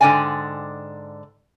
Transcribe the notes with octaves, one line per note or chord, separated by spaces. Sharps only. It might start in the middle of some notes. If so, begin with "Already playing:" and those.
G#2 D3 A#3 D5 G5 G#5